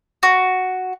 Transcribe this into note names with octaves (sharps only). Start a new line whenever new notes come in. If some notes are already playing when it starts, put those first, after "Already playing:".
F#4